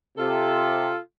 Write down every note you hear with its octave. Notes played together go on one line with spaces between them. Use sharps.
C3 F4 A4